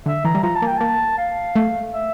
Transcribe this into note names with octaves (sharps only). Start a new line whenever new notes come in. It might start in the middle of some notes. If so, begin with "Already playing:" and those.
D3 E5
E3 A#5
G3
F3 A#5
A5
A#3 G5
A#3 A5
F5
A3
E5